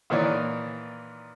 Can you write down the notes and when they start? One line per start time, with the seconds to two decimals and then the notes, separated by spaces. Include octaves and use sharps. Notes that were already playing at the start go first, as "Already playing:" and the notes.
0.10 A#2 D#3 E3 C#5 D5